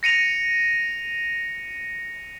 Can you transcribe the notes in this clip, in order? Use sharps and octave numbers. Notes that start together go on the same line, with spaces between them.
A#6 C#7 D#7 F7